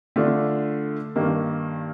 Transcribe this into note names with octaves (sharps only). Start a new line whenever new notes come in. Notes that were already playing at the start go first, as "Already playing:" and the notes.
D3 A3 D4 F4
G2 D#3 A#3